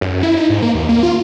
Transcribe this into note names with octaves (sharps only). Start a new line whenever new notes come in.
F#2
E4
D#4
G#2
A#3
D#2
A#3
F4